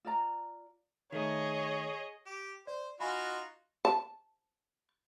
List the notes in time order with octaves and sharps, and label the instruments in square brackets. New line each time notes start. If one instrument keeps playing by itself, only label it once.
[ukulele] F4 D5 A#5
[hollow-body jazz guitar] D#3 A3 [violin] G#4 D#5 [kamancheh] C#5
[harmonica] G4
[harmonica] C5 [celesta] D5
[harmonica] D#4 F4 F#4 [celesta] G#5 B5
[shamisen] A5